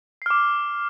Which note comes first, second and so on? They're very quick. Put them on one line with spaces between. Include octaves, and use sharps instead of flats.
C7 F6 D6